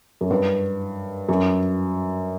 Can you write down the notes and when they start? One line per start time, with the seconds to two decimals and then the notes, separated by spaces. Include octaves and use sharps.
0.21 F#2
0.30 G2
1.29 F#2